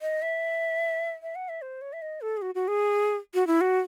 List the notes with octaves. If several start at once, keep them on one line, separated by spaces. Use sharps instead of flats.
D#5
E5
E5
F#5
E5
C5
C#5
E5
D#5
A4
G#4
F#4
F#4
G#4
F#4
E4
F#4